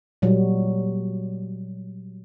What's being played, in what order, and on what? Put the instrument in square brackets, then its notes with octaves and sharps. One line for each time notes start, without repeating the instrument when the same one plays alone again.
[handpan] A#2 F#3 G3